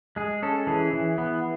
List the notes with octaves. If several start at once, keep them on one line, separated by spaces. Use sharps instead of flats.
G#3 G#4
C#4 A4
E3 G#4
E3
B3